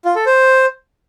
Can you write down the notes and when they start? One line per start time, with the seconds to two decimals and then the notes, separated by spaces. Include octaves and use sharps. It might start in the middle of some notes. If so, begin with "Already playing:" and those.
0.05 F4
0.16 A4
0.26 C5